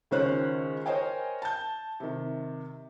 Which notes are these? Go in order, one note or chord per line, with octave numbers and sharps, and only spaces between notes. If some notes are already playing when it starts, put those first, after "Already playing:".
C#2 D#3 C#4 C5 C#5 F#6
A#4 C5 C#5 D#5 G5 G#5
A5 G6
C3 D#3